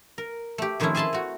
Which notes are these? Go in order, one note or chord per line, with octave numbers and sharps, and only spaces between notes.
A#4
A3 G4
F2 D#3 F3 A3 C#4 E4
G#4 E5 G#5 A5 B5 C6
A3 F#4